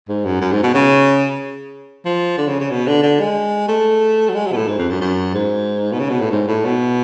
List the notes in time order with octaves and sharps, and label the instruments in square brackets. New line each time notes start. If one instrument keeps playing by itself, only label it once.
[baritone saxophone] G#2
F#2
F#2
G#2
B2
C#3
F3
D3
C#3
C#3
B2
D3
D3
G#3
A3
F#3
G#3
F#3
B2
A2
G#2
F2
F#2
F#2
G#2
B2
C#3
B2
A2
G#2
A2
B2